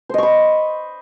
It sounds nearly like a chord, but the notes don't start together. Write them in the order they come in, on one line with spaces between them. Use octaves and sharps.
C5 D#5 C#6 B5